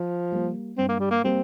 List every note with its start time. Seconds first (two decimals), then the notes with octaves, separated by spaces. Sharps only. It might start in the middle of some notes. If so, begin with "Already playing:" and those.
Already playing: F3
0.32 G3 A#3
0.78 G2 C4
0.88 A#3
0.99 G3
1.10 A#3
1.24 G3 A#3 C4